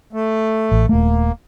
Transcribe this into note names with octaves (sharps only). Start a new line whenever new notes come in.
A3
A1
D#1 A3 A#3